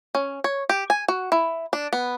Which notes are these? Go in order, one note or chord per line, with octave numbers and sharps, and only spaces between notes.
C#4
C#5
G4
G#5
F#4
E4
D4
B3